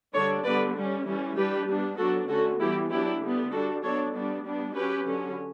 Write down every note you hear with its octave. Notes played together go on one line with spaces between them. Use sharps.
D3 G3 D4 A4 C#5
D3 G3 B3 B4 D5
G3 C#4
E3 G3 C#4
G3 D4 G4 B4
G3 B3 D4
F#3 B3 D4 F#4 A4
D3 A3 C#4 F#4 A4
E3 G3 B3 E4 G4
F#3 B3 D4 E4 G4
D3 G3 B3
G3 D4 F#4 A4
F#3 B3 D4 A4 C#5
G3 B3 D4
G3 B3 D4
F#3 C#4 G4 B4
D3 F#3 C#4